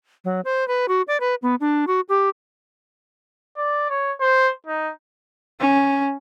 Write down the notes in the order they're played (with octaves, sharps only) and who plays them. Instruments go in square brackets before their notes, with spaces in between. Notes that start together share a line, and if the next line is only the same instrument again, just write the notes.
[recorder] F#3
C5
B4
F#4
D5
B4
B3
D4
F#4
G4
[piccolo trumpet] D5
C#5
C5
D#4
[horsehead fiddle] C#4